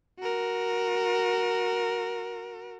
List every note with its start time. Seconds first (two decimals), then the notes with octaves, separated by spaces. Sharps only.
0.20 F#4 A#4